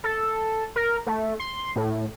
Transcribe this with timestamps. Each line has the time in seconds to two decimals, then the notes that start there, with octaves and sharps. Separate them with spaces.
0.04 A4
0.76 A#4
1.07 A3
1.40 C6
1.76 A2